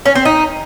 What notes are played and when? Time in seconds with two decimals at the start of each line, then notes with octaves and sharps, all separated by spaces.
0.05 C#4
0.15 C4
0.25 D#4